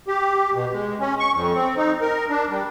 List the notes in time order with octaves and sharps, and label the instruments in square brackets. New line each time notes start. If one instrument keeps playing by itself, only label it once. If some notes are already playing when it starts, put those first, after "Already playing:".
[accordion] G4
B2
G#3
C#4
C#6
F2
C4
D#4
A#4
D4
G3